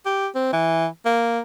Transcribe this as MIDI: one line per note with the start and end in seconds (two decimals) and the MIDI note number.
0.05 0.27 67
0.35 0.52 60
0.53 0.86 52
1.05 1.40 58